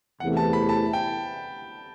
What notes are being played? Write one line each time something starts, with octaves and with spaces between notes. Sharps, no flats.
E2 C3 E3 A3 C4 F#5
A5
B5
A5
G5